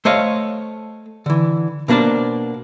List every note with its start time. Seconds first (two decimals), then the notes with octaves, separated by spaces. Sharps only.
0.05 A3 C5 C#5 D#5 F5
1.26 D3 E3
1.88 B2 A#3 D4 C5 D5